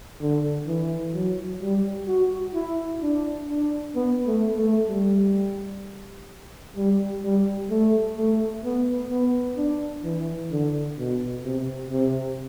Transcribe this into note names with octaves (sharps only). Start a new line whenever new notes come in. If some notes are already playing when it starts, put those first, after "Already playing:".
D3
E3
F#3
G3
F#4
E4
D4
D4
B3
A3
A3
G3
G3
G3
A3
A3
B3
B3
D4
E3
D3
B2
C3
C3